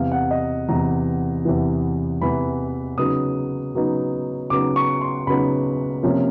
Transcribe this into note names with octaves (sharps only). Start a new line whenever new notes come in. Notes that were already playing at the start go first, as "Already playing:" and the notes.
Already playing: E2 C3 E3 F5
F#5
D#5
E2 C3 E3 A#5
E2 C3 E3
E2 C3 E3 B5
C#3 F#3 B3 D#4 D#6
C#3 F#3 B3 D#4
C#3 F#3 B3 D#4 D6
C#6
C6
C#3 F#3 B3 D#4 B5
C3 F3 A#3 C#4